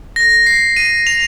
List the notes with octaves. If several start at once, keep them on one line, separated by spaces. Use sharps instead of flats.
A#6
C7
D#7
F7